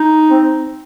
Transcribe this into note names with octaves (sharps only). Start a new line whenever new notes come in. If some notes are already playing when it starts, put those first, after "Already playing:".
Already playing: D#4
C4